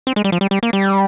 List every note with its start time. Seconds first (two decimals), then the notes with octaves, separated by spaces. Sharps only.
0.07 C4
0.16 G#3
0.24 G3
0.32 F3
0.41 G3
0.51 G3
0.63 A#3
0.73 G3